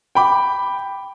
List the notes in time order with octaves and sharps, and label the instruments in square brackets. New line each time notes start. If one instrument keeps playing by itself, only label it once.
[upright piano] G5 B5 D6